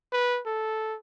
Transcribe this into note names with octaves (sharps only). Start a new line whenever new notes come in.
B4
A4